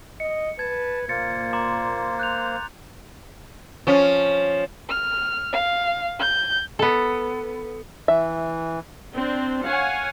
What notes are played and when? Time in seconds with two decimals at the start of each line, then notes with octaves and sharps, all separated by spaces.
0.20 D#5 C#7
0.59 B4 A5 G#6
1.09 A#2 A#3 C5 A6 C#7
1.53 A#5 C6 D6
2.19 F#6 G6 F7
3.87 F3 C#4
4.89 F6
5.53 F5
6.20 G6
6.79 B3 A4
8.08 E3 E5
9.14 C4 D4
9.65 C#5 F5 F#5 G#5